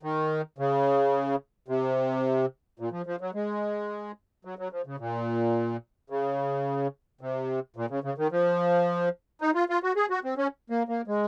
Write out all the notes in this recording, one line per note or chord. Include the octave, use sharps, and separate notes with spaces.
D#3
C#3
C3
A#2
F3
F3
F#3
G#3
F#3
F#3
F3
C#3
A#2
C#3
C3
A#2
C#3
C#3
D#3
F3
D#4
F4
F4
F#4
G#4
F#4
C4
C#4
A#3
A#3
G#3